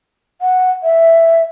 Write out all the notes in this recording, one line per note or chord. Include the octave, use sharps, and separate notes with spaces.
F#5
E5